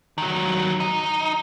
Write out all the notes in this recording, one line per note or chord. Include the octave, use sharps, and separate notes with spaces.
D#3 F#3
D#4